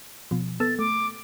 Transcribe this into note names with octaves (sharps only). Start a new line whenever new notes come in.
B2 F3
B3 A4 E6 A6
A3 D6